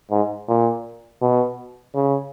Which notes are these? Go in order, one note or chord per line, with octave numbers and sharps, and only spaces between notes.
G#2
A#2
B2
C#3